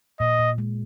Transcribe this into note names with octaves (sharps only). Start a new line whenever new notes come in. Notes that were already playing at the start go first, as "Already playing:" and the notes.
A#2 D#5
A#2
G#3